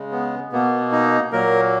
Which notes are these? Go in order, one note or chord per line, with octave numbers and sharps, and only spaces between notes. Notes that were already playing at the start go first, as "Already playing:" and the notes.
Already playing: C#3 G#3
B3
B2 A#3 B3
D#4
A#2 F#3 A#3 A#4